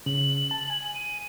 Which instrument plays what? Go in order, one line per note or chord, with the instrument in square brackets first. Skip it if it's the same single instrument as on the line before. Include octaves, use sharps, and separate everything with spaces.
[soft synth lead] C#3 [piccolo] F#7
[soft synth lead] A5
G#5
[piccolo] D#7